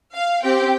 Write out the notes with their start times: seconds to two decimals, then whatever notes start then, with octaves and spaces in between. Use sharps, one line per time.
0.13 F5
0.42 C4 G4 G5